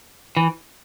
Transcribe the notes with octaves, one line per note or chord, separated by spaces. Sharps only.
E3